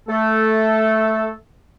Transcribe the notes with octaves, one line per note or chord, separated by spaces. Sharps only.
A3 A4